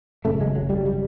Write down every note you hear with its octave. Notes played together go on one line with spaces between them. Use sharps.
G#1 F#2 C#3 A3
G#3
F#3
G3
G3